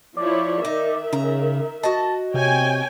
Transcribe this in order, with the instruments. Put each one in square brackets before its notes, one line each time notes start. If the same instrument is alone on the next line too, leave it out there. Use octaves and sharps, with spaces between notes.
[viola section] F3 E4 C#5 [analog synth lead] D5
[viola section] D#3 A#4 E5 [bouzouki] D#4
[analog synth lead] C#3 [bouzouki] A#5
[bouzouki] F#4 D#5 [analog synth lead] A5
[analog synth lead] C3 [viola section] C#5 G5 G#5